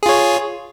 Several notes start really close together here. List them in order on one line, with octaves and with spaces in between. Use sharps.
G#4 F4 C#5